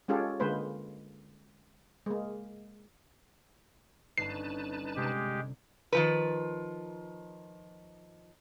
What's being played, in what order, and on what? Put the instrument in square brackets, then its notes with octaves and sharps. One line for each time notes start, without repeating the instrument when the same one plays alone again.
[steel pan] G#3 C#4 F4 G4 A4
D3 G#3 A#3 B4 C5
G#3 A#3
[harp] G1 C#4 [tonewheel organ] D#4 B4 A5 [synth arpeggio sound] C7
[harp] C3 [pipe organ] G#3 G4
[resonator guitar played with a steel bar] D#3 F3 B4